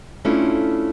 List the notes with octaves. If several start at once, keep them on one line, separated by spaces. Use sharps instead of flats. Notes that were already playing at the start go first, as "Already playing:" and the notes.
A3 C#4 D4 E4 F4